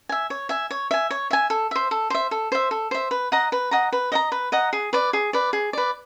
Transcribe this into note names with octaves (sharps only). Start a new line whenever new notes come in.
E5 G#5
C#5
E5 G#5
C#5
E5 G#5
C#5
E5 G#5
A4
C5 E5
A4
C5 E5
A4
C5 E5
A4
C5 E5
B4
D#5 F#5 A#5
B4
D#5 F#5 A#5
B4
D#5 F#5 A#5
B4
D#5 F#5 A#5
G#4
B4 D5
G#4
B4 D5
G#4
B4 D5